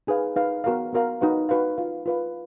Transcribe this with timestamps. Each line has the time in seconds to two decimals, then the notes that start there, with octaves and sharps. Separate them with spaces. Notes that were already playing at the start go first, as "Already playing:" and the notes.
0.07 D#4 G#4 B4 F5
0.36 D#4 G#4 B4 F5
0.64 B3 F#4 A#4 F5
0.93 B3 F#4 A#4 F5
1.21 D#4 F#4 B4 F5
1.49 D#4 F#4 B4 F5
1.78 F4 B4 F5
2.06 F4 B4 F5